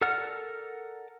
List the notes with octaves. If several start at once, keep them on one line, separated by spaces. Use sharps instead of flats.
A4 A#4 D5 F#5 F6